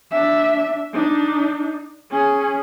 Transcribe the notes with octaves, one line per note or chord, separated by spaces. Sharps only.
D4 E5
D4 D#4
C#4 G#4